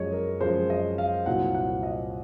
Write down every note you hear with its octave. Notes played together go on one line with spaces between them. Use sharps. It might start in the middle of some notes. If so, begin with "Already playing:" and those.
Already playing: F#2 F3 G#3 C#5 D#5
A#4
F#2 F3 G#3 C5
D#5
F5
C2 A#2 F#3 F#5
F#5
D#5